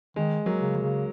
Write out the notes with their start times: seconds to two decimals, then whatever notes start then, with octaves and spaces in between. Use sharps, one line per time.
0.16 D#3 G#3
0.46 F#3 A#3
0.61 C#3
0.75 F#3
0.82 C#3